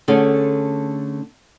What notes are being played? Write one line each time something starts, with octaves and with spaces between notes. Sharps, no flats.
D3 A3 C#4 G#4 A4